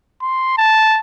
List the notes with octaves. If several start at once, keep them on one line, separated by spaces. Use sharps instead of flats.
C6
A5